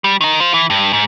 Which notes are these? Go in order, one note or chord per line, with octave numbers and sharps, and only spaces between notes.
G3
D#3 D#4
F4 C5
E3
G2
G#2